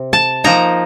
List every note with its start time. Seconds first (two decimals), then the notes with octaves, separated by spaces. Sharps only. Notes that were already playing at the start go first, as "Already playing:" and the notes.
Already playing: C3
0.13 A5
0.44 F3 A#3 D#4 A#5